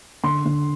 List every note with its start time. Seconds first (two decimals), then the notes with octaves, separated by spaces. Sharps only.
0.24 D3 C6
0.45 D3